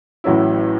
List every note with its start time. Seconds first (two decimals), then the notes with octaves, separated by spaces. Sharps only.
0.24 A1 A2 F#3 C#4 E4